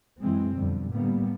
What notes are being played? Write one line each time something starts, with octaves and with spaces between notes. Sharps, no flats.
F#2 E3 G#3 C4
F2 B2 D3 G3
A2 D3 G3 A#3 B3